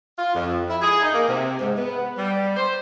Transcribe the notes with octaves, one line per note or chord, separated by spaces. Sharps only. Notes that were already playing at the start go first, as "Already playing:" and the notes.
F4
F2
E4
G#4
D#4
A#3
C3
G#2
B3
G3
C5